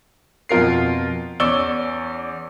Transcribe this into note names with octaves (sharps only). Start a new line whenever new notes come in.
F2 B2 F4 A#4 C7
E2 C#4 D5 C#6 E6 G7